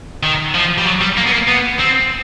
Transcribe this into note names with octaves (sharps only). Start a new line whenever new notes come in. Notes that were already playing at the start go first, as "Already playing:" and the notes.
D#3
F3
G3
F#3
G3
A#3
B3
A#3
B3
C4